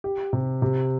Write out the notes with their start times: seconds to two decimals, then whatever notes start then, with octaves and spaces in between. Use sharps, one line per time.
0.04 G4
0.33 C3
0.62 C3